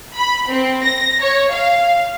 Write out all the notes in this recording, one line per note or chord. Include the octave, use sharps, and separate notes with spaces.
B5
C4
A#6
C#5
F5